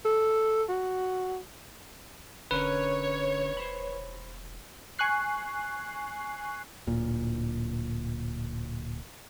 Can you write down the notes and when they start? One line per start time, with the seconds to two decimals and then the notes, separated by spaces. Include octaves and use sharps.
0.05 A4
0.69 F#4
2.51 E1 D3 C#4 A#4 B4 C#5
3.57 C5 B5
4.99 G#5 C#6 F#6 C7
6.87 D1 A#2